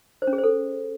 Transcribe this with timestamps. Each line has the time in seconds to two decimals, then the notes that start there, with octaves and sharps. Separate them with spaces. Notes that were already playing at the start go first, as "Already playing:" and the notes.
0.22 C5
0.27 C#4
0.33 G#4
0.38 C5
0.44 A4